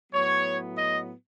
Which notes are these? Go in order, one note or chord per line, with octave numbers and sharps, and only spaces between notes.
A2 F#3 B3 C#5
D#5